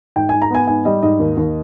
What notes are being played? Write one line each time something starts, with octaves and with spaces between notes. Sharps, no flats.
G#2 G5
G#2 G#5
A#5
B3 G#5
G#2 G#5
G3 D#5
G#2 D#5
D#2
D#2